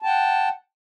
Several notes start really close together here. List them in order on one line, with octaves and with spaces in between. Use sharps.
A5 G5 F#5